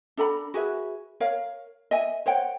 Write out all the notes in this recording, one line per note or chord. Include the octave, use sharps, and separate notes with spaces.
D4 A4 A#5 B5
F#4 G#4 B4 E5
A#4 C#5 F5
D#5 E5 G#5
C5 C#5 F#5 G5